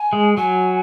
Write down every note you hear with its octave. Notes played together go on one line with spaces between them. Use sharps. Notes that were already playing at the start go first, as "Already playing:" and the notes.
Already playing: G#5
G#3
F#3 G#5